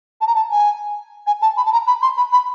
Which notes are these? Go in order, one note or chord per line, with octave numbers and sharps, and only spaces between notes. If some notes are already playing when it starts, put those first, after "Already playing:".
A5
A#5
A5
G#5
G#5
A5
B5
A5
A#5
B5
C6
B5
B5